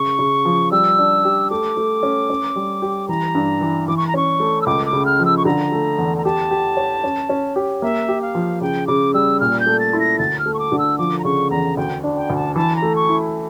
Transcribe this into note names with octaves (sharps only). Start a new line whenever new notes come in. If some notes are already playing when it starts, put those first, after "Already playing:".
Already playing: C#3 C#6
C#3
F3
G3 E6
D4
G4
A3 D6
A3
C#4
C#4
G3
G4
E3 A#5
G2
E3
E3 D6
C#6
A#5
C#4 C#6
A3
E6
C#2 D6
D6
C#3
F6
F3
E6
C#6
D3 A#5
A3
E2
A#5
G4 A5
G4
C#5
C#4
C#4
G4
A#3 E5
G4
F5
F3
C#3 G5
C#3 D6
G3 E6
A#2 F6
G6
A3
A6
E4
A#6
D2 A6
F6
A3
C#6
D6
D3
E6
F3 D6
A#5
C#3 C#6
E2 A#5
D2 G5
D4
G5
D2
A5
E3 A5
A#5
A3
C#6
E4